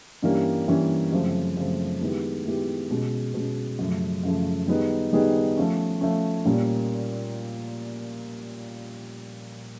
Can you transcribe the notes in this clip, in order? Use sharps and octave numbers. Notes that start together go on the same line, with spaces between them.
G2 E3 G3 A#3 C#4
G2 E3 G3 A#3 C#4
F#2 C#3 F3 A3 C4
F#2 C#3 F3 A3 C4
D#3 G#3 B3 E4 G4
D#3 G#3 B3 E4 G4
B2 G#3 C#4
B2 G#3 C#4
F#2 C#3 F3 A3
F#2 C#3 F3 A3
D#3 G3 B3 D#4 G#4
D#3 G3 B3 D#4 G#4
F3 A3 C#4
F3 A3 C#4
A#2 G3 A#3 C#4